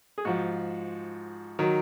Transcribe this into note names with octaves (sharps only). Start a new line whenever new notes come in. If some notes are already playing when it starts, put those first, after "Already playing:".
G#4
G#2 F3 F#4
D#3 F#3